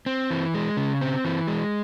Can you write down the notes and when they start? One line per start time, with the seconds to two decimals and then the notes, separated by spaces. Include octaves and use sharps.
0.06 C4
0.31 E3
0.54 G#3
0.77 C#3
1.01 C4
1.25 E3
1.48 G#3